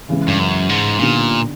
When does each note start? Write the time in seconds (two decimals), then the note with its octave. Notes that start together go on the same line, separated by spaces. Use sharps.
0.09 C#3 E3 G#3
0.28 G2
0.39 F#2
0.69 G#2
0.99 A#2 D3 G3 B3 D#4